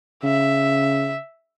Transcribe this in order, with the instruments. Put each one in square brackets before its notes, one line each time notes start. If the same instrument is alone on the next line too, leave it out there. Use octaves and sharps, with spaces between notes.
[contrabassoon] C#3 [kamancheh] E5